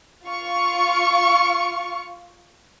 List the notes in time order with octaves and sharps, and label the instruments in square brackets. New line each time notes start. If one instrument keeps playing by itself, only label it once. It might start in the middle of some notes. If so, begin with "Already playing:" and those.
[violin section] F4 F5 C#6